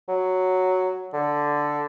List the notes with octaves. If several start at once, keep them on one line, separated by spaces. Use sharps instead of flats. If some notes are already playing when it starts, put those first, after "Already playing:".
F#3
D3